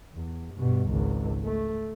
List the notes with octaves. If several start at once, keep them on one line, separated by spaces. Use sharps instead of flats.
E2
G2 B2
G#1 C#2
A3